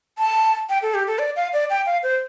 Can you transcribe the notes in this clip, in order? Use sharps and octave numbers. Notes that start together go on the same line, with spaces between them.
A5
G5
A4
G4
A4
D5
F5
D5
G5
F5
C5